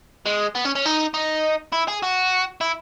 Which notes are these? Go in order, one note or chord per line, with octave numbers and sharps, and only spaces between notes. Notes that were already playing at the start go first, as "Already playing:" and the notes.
G#3
B3
C#4
C#4
D#4
D#4
E4
G#4
F#4
E4